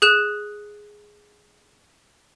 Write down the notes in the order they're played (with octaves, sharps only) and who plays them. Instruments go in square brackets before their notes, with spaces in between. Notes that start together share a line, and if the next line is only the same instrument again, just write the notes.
[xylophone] G#4 F#6 E7